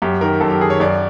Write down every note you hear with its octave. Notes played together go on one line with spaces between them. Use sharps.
F#2 G4
D#3 A#4
F#2 A4
G4
D#3 G#4
C#5
F#2 D5